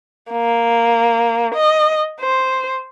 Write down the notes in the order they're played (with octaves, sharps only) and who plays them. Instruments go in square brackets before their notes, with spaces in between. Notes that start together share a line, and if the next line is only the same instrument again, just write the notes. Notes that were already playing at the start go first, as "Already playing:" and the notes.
[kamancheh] A#3
D#5
C5